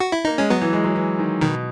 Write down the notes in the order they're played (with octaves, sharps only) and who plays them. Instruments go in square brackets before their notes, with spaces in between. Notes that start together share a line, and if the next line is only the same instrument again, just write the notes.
[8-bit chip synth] F#4
E4
[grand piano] A#3 [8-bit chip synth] D#4
[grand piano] G#3 [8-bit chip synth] C#4
[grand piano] F#3 [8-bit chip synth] B3
[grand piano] E3
G#3
F#3
E3
D#3
[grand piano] B2 [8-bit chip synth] D#3